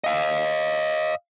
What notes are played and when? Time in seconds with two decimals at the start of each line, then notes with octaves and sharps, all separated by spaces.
0.04 D#5 F5